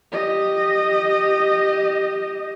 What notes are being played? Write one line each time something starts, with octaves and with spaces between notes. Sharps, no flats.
G4 D#5